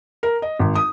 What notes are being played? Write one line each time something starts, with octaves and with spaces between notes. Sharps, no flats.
A#4
D#5
G#1
D#6